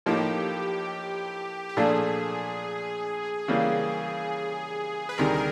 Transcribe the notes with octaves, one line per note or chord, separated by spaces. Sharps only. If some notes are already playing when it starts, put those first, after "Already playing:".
A2 F3 A#3 D#4 G4
G4
A#2 F3 A3 D4 G#4
C#3 E3 G3 A#3
B4
D2 C3 D#3 G3 A#4
A#4